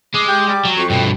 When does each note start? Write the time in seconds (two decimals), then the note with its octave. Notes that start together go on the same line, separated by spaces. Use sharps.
0.15 G#3 D6
0.28 G4
0.48 G3
0.65 F#3
0.77 F2 C#6
0.90 G2 B2 G5